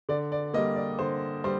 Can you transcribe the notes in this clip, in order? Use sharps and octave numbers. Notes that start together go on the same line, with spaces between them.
D3 D5
D5
G3 A#3 D#5
D5
D3 C5
G3 C5